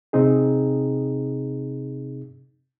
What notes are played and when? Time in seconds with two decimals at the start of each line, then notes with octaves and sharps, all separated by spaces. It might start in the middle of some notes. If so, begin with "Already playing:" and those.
0.13 C3 C4 D#4 G#4